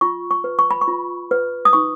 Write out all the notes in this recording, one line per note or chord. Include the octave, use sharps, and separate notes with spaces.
F4 C#6
C#6
B4
C#6
B5
C#6
F4
B4
D#6
D#4 C#6